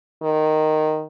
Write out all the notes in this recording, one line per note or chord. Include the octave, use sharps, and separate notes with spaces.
D#3